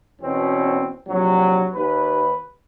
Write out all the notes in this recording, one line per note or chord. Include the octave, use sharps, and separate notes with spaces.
E2 B2 C4 C#4
A#1 C3 F#3
D#2 B4